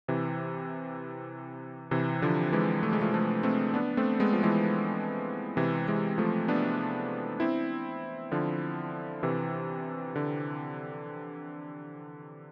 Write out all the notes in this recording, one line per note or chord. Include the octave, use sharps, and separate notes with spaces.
C3 E3
C3 E3
D3 F3
E3 G#3
A3
G#3
F3 A3
F3 A3
A3 C4
B3 D4
A3 C4
G#3 B3
F3
E3 G#3
C3 E3
E3 G#3
F3 A3
B3 D4
C4 E4
D3 F3
C3 E3
D3